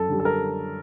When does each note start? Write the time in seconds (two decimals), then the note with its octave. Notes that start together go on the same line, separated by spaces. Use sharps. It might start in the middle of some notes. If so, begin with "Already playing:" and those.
Already playing: F#2 A4
0.09 D3 G3
0.20 A4
0.25 A#4